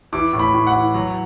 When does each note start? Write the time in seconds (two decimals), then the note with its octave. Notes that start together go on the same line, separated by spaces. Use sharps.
0.13 E3 D6
0.33 A2
0.39 B5
0.54 A2
0.67 F#5
0.74 E3
0.94 F#3